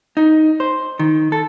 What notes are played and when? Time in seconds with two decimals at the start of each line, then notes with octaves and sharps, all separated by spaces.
0.17 D#4
0.60 C5
0.99 D#3
1.32 A4